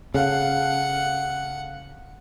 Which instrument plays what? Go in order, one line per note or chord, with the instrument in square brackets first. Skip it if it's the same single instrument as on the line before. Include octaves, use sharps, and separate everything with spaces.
[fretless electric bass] C#3 [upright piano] A4 F5 [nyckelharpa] F#5